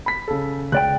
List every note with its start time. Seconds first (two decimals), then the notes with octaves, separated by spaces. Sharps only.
0.06 B5 B6
0.28 C#3 A4
0.72 C#2 D5 G5 F#6